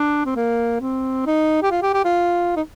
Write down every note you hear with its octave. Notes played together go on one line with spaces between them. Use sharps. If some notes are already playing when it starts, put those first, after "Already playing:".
Already playing: D4
C4
A#3
C4
D#4
G4
F4
G4
G4
F4
D#4